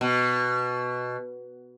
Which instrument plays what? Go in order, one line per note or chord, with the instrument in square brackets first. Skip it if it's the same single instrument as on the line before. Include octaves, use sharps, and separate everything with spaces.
[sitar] B2